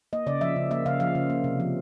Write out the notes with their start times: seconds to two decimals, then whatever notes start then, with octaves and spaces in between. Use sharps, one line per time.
0.13 A#3 D#5
0.26 C#3 D5
0.41 F3 E5
0.56 C#3
0.71 A#3 E5
0.86 C#3 F5
1.00 F3 F5
1.15 C#3
1.30 A#3
1.44 C3
1.60 F3